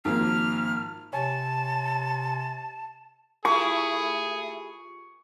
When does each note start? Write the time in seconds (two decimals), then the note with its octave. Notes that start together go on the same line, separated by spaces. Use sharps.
0.05 G#1 F3 A#3 F6
1.13 C3 C#5 G#5 A5
3.45 A3 E4 F4 G4 G#4 B5 C#6